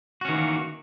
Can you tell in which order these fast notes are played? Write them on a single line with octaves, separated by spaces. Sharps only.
F#4 C#4 D#3 E3 A#3